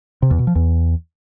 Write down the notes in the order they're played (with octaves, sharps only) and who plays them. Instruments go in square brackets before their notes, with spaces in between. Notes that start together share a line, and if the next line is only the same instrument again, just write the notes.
[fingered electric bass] C3
E2
B2
F3
E2